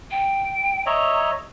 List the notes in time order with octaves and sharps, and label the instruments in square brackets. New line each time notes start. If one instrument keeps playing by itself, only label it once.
[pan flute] G5
[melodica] C#5 D#5 E5 [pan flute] A#5